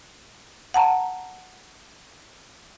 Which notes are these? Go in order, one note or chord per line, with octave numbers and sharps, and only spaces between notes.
F#5 A5 A#5